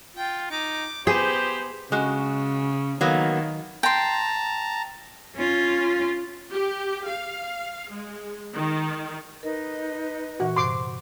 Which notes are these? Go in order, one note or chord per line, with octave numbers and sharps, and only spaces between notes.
F4 G5
D#4 D6
B3 G4 G#4 B4 C5
C#3 G#3 F#4
D#3 F#3 A#3 B3
G5 A5 A#5 C6
C#4 F4
G4
F5
G#3
D#3
D#4 A#4 B4 D#5
A#2 E3 F#4
G2 C3 C6 D6